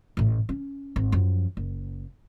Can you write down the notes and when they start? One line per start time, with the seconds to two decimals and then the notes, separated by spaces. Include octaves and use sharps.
0.17 A1 A2
0.49 C#4
0.96 G#1
1.12 F#2 F3
1.57 F#1